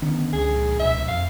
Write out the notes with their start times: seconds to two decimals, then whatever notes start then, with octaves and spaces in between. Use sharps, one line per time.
0.02 D3 D#3 B3 C#4
0.33 C#2 G#4
0.53 A#1 G#2
0.80 C#2 B2 E5
1.08 F2 F5